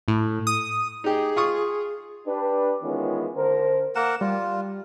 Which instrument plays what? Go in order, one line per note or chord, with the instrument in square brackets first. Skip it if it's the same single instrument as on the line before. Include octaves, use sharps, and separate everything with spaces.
[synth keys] A2
D#6
[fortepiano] D#4 G4 [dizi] G#4
[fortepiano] F4 C#6 D#6
[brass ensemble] D4 G4 B4
D#3 E3 G#3 B3 C#4 F4
D3 A#4 C5
[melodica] A#3 A#4 F#5 [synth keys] E7
[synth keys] G3 [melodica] F4